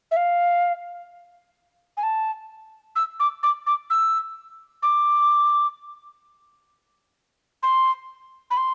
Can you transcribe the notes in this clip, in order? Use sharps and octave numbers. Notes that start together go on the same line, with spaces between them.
E5
F5
G#5
A5
E6
D6
D6
D6
E6
D6
C6
B5
C6